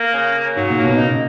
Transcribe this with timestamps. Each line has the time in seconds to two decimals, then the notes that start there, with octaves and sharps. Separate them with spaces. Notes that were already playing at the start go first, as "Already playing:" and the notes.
Already playing: A#3
0.14 C#3
0.35 C#3
0.56 G#2 F#3
0.69 A#2
0.76 A#3
0.83 B2
0.97 C#3 D#4